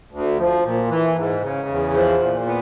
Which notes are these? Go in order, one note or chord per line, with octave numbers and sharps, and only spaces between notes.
D2
F3
A#2
E3
G#2
C#3
E2
F3
A#2
B3